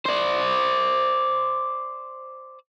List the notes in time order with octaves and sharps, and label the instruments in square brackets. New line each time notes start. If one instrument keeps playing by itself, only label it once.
[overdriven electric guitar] C5 D5